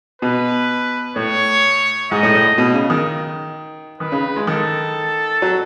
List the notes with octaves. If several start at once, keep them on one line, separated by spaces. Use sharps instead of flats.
B2 B4
A2 C#5
G#2 D#5
A2
A2
B2
C#3
D#3
D#3 B4
C#3
G#3
D#3 A4
F#3